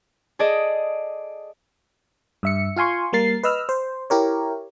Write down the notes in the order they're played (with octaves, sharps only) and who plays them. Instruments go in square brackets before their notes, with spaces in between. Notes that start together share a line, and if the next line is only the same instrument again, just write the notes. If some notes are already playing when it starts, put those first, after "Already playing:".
[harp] G#4 A4 D5 D#5
[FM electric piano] G2 E5 C#7
F4 F5 G#5 C6 C#6
G3 A#3 A#4 A6 C7
B4 D#5 E6 F6
C5
E4 G4 A#4 C#5